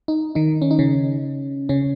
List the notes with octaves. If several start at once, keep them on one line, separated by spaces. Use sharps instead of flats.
D#4
D#3 D#4
C#4
D#4
C#3 C#4
C#3 C#4